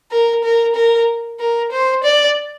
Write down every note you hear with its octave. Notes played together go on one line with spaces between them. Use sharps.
A#4
A#4
A#4
A#4
C5
D5